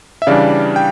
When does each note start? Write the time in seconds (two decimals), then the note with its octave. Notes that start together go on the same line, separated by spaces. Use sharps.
0.22 E5
0.27 C#3 E3 G3 D4 D5 F5
0.76 G5